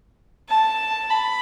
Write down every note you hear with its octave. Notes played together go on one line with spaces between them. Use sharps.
A5
B5